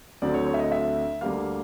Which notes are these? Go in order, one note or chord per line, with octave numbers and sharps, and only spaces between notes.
D2 D3 F#3 A3 C4 D5
C#5
C#5
E5
D#5
E5
D2 D3 G3 A#3 F5